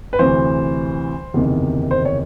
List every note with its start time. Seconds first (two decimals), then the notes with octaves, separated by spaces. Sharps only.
0.13 B4
0.19 D2 C3 E3 C5
1.34 F#1 E2 C3 D#3
1.91 C5
2.05 C#5